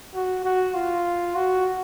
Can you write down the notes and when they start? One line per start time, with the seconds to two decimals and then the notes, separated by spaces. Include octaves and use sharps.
0.15 F#4
0.45 F#4
0.74 F4
1.35 F#4